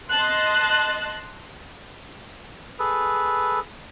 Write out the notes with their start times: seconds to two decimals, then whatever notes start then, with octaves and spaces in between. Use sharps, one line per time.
0.10 D#5 A5 C6 F#6
2.79 G#4 A4 B4